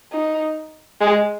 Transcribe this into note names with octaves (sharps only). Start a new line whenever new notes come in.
D#4
G#3